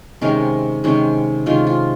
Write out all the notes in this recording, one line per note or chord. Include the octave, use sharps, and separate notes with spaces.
C3 D#3 G#3 C#4 A#4
C3 D#3 G#3 C#4
C3 D#3 G#3 C#4 F4
F4